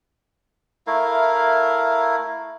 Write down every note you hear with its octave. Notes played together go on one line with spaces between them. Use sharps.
A3 E4 A#4 F5